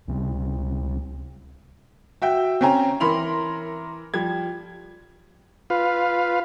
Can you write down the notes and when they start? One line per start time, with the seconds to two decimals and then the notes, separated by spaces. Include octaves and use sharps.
0.08 C#2 C3 G3
2.22 F#4 E5 G5
2.61 C4 C#4 G5 G#5 A#5
3.00 E3 A#4 B5 C6 F7
4.14 F3 G3 G#6
5.70 F4 B4 F5